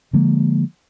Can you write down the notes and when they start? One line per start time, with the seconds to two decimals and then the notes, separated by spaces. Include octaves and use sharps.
0.13 D3 F3 G#3 A#3